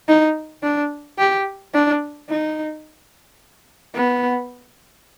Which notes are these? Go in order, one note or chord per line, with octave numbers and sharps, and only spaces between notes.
D#4
D4
G4
D4
D#4
B3